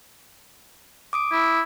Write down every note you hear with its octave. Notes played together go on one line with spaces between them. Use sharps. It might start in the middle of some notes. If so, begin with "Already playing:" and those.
D6 D#6 D7
E4